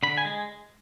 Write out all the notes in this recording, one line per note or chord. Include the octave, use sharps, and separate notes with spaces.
D3 B5
G#5
G#3